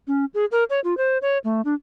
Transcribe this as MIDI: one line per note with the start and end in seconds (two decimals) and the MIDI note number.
0.08 0.25 61
0.34 0.45 68
0.52 0.64 70
0.70 0.80 73
0.84 0.97 65
0.97 1.18 72
1.22 1.38 73
1.44 1.61 57
1.65 1.74 62